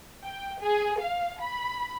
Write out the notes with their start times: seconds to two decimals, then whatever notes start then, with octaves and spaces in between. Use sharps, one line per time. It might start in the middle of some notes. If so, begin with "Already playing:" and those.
0.24 G5
0.61 G#4
1.00 F5
1.41 B5